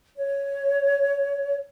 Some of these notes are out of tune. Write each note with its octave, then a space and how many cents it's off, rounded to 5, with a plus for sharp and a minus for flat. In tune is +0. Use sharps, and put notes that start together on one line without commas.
C#5 +5